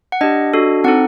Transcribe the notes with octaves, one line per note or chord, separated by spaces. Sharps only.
F#5
D4 G4 D#5
D4 F#4 A4
C4 D#4 A4 F#5